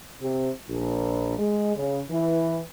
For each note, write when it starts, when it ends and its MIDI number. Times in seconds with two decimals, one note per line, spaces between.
0.21 0.50 48
0.69 1.37 34
1.38 1.72 56
1.76 2.00 49
2.10 2.60 52